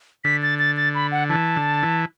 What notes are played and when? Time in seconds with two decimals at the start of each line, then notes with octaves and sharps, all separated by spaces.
0.24 D3 B6
0.42 A6
0.59 A6
0.77 A6
0.95 B5
1.12 F#5
1.29 E3 A5
1.56 D3
1.83 E3